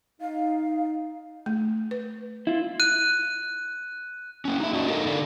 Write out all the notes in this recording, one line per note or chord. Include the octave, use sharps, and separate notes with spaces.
D#4 F5
A3
B4
E4 F4
F#6 D#7
A#3 C#4
D#4 E5
C#4 D4 F#4 D#5
A#3 D#4 A4 A#4 D#5 F5
D3 D5 F5